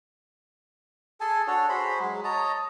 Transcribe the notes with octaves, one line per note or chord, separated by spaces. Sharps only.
G#4 A4 G#5 A5
D4 F#4 A4 C#5
F#4 G#4 C5 B5
F#3 G#3
C#5 D#5 A5 A#5